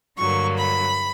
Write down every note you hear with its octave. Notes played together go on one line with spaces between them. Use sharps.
G2 D3 F#3 A#3 C#6
B5